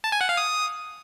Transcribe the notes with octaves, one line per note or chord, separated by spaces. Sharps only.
A5
G#5
F#5
F5
D#6